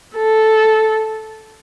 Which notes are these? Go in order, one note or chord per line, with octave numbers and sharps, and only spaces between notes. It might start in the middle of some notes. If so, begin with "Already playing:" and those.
A4